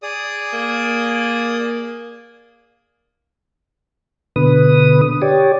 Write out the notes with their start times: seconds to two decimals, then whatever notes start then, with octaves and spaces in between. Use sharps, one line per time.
0.03 G#4 D5 D#6
0.53 A#3
4.36 B2 D3 B4 D#6
5.22 G4 C#5 D5